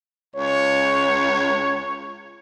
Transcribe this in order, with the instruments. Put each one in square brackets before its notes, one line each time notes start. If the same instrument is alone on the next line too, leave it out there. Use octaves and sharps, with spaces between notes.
[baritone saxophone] C#2 [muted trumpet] C#5